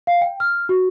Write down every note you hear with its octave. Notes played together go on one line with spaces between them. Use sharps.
F5
G5
F6
F#4